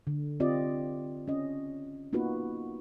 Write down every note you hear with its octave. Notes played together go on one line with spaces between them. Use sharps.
D3
C4 F4 G4 D5 D#5
C#4 D#5
A#3 B3 D#4 F4 F#4 B4